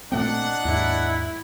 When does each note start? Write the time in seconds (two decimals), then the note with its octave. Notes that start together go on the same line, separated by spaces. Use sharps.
0.12 A#2 A3 C4 D4 D#4 F#5
0.65 D#2 G#2 E4